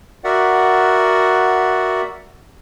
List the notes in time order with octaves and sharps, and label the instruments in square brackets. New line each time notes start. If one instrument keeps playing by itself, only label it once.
[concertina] F#4 A#4 D5 E5 F#5